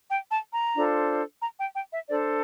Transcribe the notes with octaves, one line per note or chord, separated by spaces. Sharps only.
G5
A5
A#5
D4 F4 A4 C5
A#5
G5
G5
E5
D4 A4 C5 D5